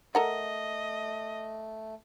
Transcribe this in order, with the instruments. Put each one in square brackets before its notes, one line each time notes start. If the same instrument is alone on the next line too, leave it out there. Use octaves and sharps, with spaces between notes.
[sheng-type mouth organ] A3 [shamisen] A4 A#4 F#5 [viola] D#5